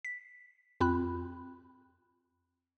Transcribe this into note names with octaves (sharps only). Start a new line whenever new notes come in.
B6
F2 C4 F4 B5 F#6